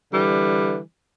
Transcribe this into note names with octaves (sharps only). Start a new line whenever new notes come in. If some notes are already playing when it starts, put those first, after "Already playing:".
D3 E3 G3